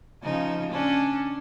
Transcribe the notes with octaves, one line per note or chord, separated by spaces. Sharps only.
C#3 F3 D#4
C#4 D4